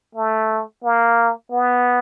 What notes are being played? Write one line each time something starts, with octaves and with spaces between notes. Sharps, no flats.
A3
A#3
B3